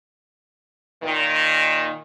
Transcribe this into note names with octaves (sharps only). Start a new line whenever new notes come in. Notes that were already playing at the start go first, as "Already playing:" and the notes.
A#2 D#3